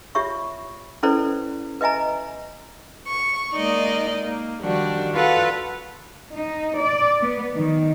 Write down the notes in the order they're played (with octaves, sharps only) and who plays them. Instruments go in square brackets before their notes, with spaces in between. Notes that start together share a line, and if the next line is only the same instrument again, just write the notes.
[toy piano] F4 G4 C#5 E5 C#6
C#4 E4 A4 B4 C5 D5
B4 D#5 E5 G#5 A#5
[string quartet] C#6
G#3 A#3 D#4 D5 D#5
A#3
D#3 F3 G3 D4 F#4
F4 F#4 A4 B4 F5 F#5
[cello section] D#4
D5
B3
D#3